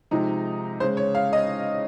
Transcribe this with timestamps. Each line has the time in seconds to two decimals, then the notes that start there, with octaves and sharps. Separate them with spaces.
0.11 C3 F3 G#3 D#4
0.80 C#3 G#3 C5
0.97 C#5
1.15 F5
1.33 D#5